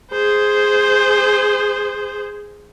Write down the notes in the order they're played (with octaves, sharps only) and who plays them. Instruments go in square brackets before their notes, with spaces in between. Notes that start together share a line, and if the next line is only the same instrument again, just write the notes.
[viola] G#4 C5